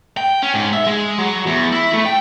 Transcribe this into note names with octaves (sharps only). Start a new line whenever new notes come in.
G5
C#4
G#2
E5
G#3
F#3
E2
E4
A3
G5